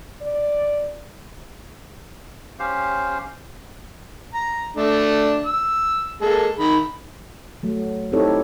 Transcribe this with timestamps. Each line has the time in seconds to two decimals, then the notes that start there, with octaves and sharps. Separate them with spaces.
0.21 D5
2.59 C#4 G4 C5 F5
4.34 A#5
4.77 A3 D4
5.46 E6
6.21 G#3 A#3 A4
6.59 D#3 B5
7.63 F#3 A3
8.12 C4 D#4 E4 G4 A4 C#5